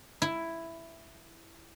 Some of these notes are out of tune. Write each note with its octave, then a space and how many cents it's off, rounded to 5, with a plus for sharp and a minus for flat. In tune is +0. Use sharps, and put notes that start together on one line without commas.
E4 +5